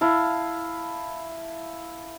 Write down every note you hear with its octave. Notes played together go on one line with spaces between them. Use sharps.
E4 F5 A5